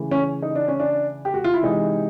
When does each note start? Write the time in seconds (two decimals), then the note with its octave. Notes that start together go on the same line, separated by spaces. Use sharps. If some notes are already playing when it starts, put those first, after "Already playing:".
Already playing: C#3 E3 A3
0.11 C#4
0.42 D#4
0.55 D4
0.68 C#4
0.80 D4
1.25 G4
1.34 F#4
1.44 F4
1.54 E4
1.63 C3 E3 G#3 D#4